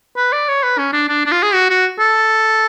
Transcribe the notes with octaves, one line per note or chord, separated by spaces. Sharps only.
B4
D5
C#5
B4
C#4
D4
D4
D4
F4
G#4
F#4
F#4
A4